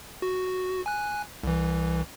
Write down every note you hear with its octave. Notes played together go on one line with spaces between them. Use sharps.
F#4
G#5 F#6
C2 E3